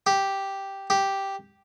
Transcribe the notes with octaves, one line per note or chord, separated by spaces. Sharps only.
G4
G4